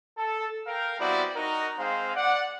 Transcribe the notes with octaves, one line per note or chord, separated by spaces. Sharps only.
A4
A#4 F5 G5
G3 B3 C4 E4 F#4 D5
D#4 F#4 A#4
G#3 C4 C5 F5
D5 F#5